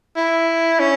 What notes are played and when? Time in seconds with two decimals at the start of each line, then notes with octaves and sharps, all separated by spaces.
0.16 E4
0.80 C#4